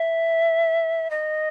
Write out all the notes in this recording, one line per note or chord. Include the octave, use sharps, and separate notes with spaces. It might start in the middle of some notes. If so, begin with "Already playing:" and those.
Already playing: E5
D#5